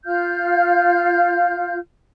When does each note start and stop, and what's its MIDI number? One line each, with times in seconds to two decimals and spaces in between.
0.05 1.77 65
0.05 1.77 77
0.05 1.77 89
0.05 1.77 91